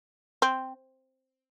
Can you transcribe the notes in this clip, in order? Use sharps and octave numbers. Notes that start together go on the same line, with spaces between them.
C4